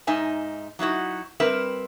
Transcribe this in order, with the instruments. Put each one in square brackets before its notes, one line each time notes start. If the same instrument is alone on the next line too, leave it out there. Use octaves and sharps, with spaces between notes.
[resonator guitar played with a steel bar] G#2 D#4 E5 G#5
F#3 D#4 E4 F#4
G3 C4 A#4 B4 E5